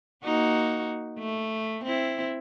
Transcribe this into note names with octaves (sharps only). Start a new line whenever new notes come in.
A#3 D#4 F#4
A3
C4 E4